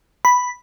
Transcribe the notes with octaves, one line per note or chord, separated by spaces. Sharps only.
B5